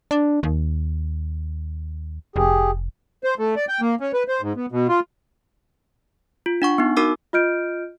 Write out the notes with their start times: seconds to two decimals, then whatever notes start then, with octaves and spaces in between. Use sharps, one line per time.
0.11 D4
0.43 D#2
2.36 F1 G4 G#4
3.24 C5
3.39 A3
3.56 D5
3.68 G5
3.81 A#3
4.00 C#4
4.13 B4
4.28 C5
4.41 G#2
4.56 B3
4.72 B2
4.88 F4
6.46 F4
6.62 D4 F#5 C#6
6.78 B3 D#4
6.97 D#4 F#4 A#4 D6 E6
7.33 F4 D#5 F6 G6 D7